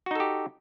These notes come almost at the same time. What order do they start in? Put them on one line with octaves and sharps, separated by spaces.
F#4 D#4 A4 G4